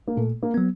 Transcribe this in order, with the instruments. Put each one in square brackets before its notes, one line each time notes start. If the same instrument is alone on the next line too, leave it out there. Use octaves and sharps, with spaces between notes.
[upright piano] A#3
[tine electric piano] A#2 [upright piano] A3
[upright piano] A#3
[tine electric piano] F#3 B3